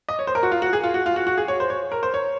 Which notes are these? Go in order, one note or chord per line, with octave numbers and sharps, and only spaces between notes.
D#5
C#5
C5
A#4
F#4
F4
F#4
G#4
F4
F#4
F4
F#4
F#4
G#4
C#5
C5
C#5
A#4
C5
C#5